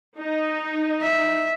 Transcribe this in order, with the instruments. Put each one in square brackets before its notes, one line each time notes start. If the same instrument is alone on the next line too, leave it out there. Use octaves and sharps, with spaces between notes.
[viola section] D#4
[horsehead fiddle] E5